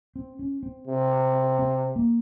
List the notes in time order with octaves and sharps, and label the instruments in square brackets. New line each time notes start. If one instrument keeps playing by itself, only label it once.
[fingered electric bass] C4
C#4
C4
[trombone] C3
[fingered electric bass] C4
A#3